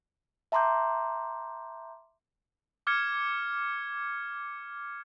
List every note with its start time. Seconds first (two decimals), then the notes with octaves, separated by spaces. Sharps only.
0.52 E5 A5 A#5 C6 D6 G6
2.87 D6 F6 G#6 C#7